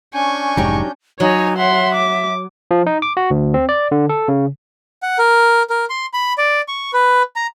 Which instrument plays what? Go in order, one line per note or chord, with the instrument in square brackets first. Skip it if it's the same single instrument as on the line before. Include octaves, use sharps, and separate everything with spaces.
[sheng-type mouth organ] C#4 D4 G6 [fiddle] G#5 C#6
[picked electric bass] F1 G#2 [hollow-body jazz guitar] F#3 D#4 G4
[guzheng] F#3 [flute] D#4 [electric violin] C#5 G#5
[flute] E5 [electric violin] F#5 C6
[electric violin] D6
[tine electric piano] F3
D#4
D6
F#4
D2
C4
D5
D3
A4
C#3
[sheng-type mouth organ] F#5
A#4
A#4
C6
B5
D5
C#6
B4
A#5